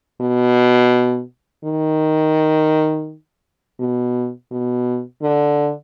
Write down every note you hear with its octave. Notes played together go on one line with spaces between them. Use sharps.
B2
D#3
B2
B2
D3